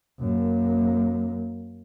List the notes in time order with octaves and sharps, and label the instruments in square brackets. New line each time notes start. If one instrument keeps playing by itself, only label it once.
[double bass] F#2 A#3